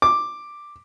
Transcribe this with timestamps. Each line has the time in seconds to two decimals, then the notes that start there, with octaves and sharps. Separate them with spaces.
0.02 D6